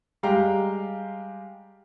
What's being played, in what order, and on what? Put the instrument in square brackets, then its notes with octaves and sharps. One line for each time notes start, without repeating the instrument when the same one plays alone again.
[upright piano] G3 G#3 G4 F5 G5 A#5